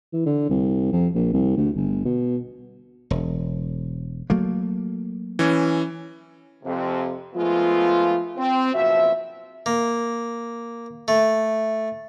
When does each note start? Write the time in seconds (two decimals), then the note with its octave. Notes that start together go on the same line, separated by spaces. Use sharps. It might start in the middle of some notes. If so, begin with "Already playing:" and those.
0.13 E3
0.26 D3
0.50 C2
0.92 F2
1.14 A#1
1.33 C2
1.57 D2
1.76 G1
2.05 B2
3.11 E1
4.30 F#3 A3 A#3
5.39 E3 C#4
6.64 F2 C3 C4
7.35 F3 G#3 A3 B3 F4
8.37 C4
8.74 F#1 B2 F3 F#4 E5
9.66 A#3
11.08 A3